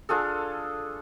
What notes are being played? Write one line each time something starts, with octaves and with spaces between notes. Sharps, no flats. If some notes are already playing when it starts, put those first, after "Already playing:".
D4 F4 G#4 A4